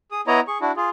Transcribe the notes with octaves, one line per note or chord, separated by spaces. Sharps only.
G#4 D#6
B3 E4 C#5 D#5 A#5
G#4 C#6
D4 E4 F#4
F4 G#4